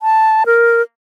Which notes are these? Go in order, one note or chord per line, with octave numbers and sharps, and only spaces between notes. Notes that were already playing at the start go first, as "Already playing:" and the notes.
A5
A#4